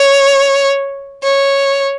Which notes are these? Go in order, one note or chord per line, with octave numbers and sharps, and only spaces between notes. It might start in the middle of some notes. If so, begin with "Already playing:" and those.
Already playing: C#5
C#5